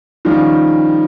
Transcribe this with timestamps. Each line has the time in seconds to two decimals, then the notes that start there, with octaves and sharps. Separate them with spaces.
0.25 D#3 F3 G3 C#4 F4 G4